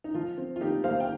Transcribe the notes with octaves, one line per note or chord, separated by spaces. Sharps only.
D#4
F3 F4
C4
F4
A#2 D#4 G4
A#1 C5 F5
G5